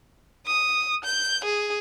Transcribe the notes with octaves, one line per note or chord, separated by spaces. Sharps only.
D#6
G6
G#4